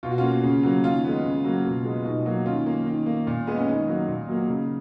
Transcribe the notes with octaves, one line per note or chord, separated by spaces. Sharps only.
B2 F4
F#4
A#3 C#4 F4
C#3
F#3 A#3
D#3 C#4 F4
G#3 B3
C#3
F#3 A#3
B2
G#3 B3
B2 D#4
F#3 A#3
D#3 C#4 F4
A#3
D#3
A#3
A#2
G#3 B3
C#4
D#3 D#4
F#3 A#3
A#2
F#3 A#3
C#3